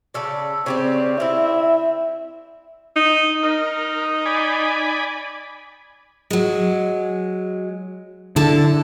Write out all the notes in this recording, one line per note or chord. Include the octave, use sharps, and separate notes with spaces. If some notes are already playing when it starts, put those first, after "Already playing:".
C#3 A4 D5
C#3 C4 G4 D5
C4 E4 E5
D#4
D#4 A#4
D5 G#5 B5
F#3 G#3
D3 E4 A4 A5